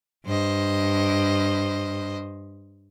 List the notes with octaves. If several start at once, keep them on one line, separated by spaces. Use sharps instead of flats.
G2 C5 D#5